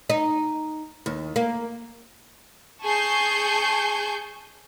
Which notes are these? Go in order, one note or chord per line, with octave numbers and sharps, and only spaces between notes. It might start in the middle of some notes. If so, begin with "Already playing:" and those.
D#4
D#2
A#3
G#4 G#5 A5 C#6 G6 C7